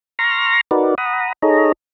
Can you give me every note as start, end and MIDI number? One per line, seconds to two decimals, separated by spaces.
0.19 0.61 82
0.19 0.61 84
0.19 0.61 85
0.19 0.61 89
0.19 0.61 94
0.71 0.95 63
0.71 0.95 66
0.71 0.95 70
0.71 0.95 71
0.71 0.95 74
0.98 1.32 78
0.98 1.32 82
0.98 1.32 83
0.98 1.32 87
1.42 1.72 63
1.42 1.72 68
1.42 1.72 69
1.42 1.72 73
1.42 1.72 75
1.42 1.72 82